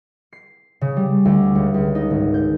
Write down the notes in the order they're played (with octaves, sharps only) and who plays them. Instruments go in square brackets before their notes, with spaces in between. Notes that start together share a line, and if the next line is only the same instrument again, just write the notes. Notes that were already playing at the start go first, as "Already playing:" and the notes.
[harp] C7
C#3
G3
D2
C#2
C#2
D#4
G#1
G6